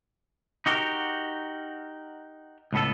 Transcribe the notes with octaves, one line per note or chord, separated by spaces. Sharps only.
D#4 F#4 G4 A#4
C#2 A2 B3 A4